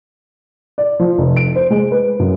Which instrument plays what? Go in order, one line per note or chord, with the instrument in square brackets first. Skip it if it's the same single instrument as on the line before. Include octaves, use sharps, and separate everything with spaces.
[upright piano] D5
F3
F1
D7
C5
G#3
B4
F#2